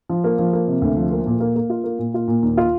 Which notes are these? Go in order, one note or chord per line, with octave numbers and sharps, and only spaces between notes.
F3
A#3
F3
A#3
C3
D2
F3
A#3
A#2
A#3
A#3
F4
A#3
A#2
F4
A#2
D#2
F4